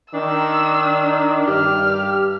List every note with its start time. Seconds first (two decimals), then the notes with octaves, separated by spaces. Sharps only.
0.14 D#3 D4 E6
1.48 G2 G4 F6